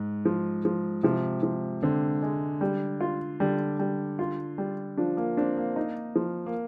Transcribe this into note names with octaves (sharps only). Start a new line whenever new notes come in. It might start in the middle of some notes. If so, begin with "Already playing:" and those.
Already playing: G#2
F3
F3
C3 F3
F3
D3 C4
G#3
G3
F4
D3 G3
G3
F4
G3
F3 D4
A#3
C4 D4
A#3
D#4
F3
A#3